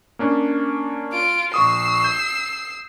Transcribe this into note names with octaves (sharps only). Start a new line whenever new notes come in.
A#3 C#4 D4
F4 D7
A#1 C#6 D#6 E6 C7
G6